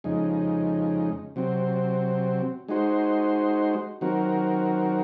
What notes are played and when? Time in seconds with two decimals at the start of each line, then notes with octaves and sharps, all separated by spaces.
0.04 F2 C#3 G#3 D#4
1.36 C3 F#3 C4
2.68 G#3 D#4 F#4 C5
4.01 D#3 F#3 C4 F#4 A#4